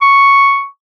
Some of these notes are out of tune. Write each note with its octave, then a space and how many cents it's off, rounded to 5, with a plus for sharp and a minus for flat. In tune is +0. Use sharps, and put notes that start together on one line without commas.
C#6 +0